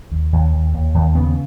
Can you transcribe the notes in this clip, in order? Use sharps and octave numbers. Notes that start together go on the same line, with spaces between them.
D#2
D#2
D#2
D#2
D#2
C#3 B3